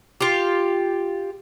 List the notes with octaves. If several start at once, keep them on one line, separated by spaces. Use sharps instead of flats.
F4 G4